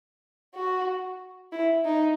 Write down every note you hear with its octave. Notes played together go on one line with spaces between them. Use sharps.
F#4
E4
D#4